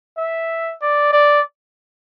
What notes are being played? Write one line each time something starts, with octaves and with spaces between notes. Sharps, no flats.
E5
D5
D5